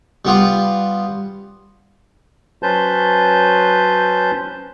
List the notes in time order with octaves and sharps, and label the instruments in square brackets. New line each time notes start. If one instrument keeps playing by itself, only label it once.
[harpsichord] G3 B3 F4
[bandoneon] F#3 C#4 B4 C5 A5 G6